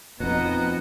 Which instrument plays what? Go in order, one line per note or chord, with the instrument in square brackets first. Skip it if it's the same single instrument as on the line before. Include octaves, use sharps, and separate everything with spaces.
[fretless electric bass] F2 B2 [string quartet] B3 D#4 [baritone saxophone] F#4